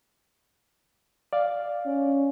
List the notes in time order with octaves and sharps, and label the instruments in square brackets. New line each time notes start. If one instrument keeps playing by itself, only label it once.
[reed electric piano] D5 F5
[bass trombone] C#4